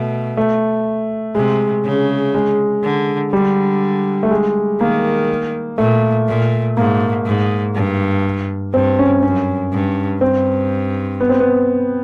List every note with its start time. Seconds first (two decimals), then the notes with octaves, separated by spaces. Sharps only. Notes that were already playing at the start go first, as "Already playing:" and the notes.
Already playing: B2 A3
0.37 A3
1.35 C3 G#3
1.85 C#3
2.34 G#3
2.84 D3
3.32 D3 G3
4.23 A3
4.31 G#3
4.81 D#3 A#3
5.78 A#2 A3
6.28 A#2
6.77 G#2 A#3
7.26 G#2
7.75 G2
8.74 G2 C4
8.99 C#4
9.23 F#2 C#4
9.72 G2
10.21 G2 C4
11.21 B3
11.29 C4
11.40 B3